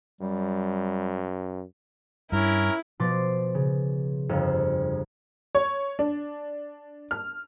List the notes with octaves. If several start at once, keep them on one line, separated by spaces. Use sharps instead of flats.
F#2 G3
G2 C#4 E4 A#4
B2 F3 C6 D6 A6 C7
C#3
G1 F2 F5
C#5
D4
F6